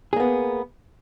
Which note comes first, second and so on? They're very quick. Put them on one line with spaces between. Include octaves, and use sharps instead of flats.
G#4 A#3 B3